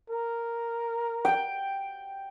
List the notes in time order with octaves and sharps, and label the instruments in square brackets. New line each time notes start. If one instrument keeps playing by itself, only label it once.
[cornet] A#4
[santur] G5